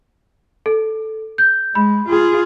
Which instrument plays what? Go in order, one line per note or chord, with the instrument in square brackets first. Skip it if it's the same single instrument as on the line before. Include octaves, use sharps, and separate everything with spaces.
[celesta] A4
G6
[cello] G#3 [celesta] B5
[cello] F4 G#4